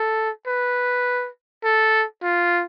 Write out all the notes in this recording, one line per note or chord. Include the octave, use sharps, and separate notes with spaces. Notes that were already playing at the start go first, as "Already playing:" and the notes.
Already playing: A4
B4
A4
F4